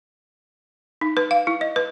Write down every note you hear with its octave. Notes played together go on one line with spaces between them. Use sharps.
D#4
B4
F5
E4
D#5
B4